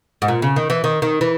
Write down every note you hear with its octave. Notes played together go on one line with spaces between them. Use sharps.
G#2
A#2
C#3
D#3
E3
D#3
D#3
E3